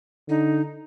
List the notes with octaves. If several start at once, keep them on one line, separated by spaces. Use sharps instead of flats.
D3 D#4